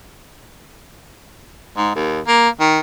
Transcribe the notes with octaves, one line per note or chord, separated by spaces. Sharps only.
G#2
D#2
A#3
D#3